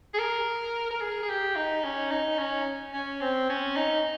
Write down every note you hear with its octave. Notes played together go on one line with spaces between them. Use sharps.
G#4
A#4
A#4
G#4
G#4
G4
D#4
C#4
D#4
C#4
C#4
C4
C#4
D#4